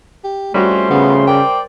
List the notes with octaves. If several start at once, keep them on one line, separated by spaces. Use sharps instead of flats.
G4
F2 G3 A3 C#4 F#4 C6
C#3 B3
A#4 C5 D5 G5